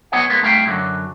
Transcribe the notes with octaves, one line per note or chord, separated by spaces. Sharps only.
B3 C#5 D#5 F#5 G#5
G#3 A#3 B3
G2 A3 E4 F5 G5
F#2 D3 F#3